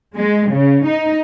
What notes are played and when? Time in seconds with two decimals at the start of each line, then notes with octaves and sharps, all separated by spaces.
0.17 G#3
0.52 C#3
0.88 D#4